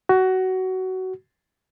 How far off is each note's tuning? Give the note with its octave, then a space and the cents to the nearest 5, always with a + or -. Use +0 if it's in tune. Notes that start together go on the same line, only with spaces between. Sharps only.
F#4 +20